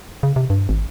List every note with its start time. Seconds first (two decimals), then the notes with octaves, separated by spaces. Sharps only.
0.23 C#3
0.36 C3
0.50 G2
0.69 G#1